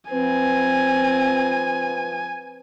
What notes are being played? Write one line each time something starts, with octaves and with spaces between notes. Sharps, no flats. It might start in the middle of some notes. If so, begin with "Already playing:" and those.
F3 C4 B4 G#5